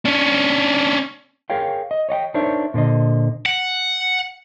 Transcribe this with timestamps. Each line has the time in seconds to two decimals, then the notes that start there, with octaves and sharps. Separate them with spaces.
0.05 C#4 D4
1.50 G#4 A#4 C#5 F5 G5
1.91 D#5
2.09 C#5 D#5 F#5 G5
2.34 D4 D#4 A#4 C5 C#5 E5
2.74 A#2 D3 C5 D#5
3.46 F#5